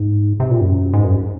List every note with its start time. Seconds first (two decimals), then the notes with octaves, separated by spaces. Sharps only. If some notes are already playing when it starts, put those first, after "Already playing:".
Already playing: G#2
0.40 C3
0.51 A#2
0.61 F#2
0.93 G#2
1.04 F#2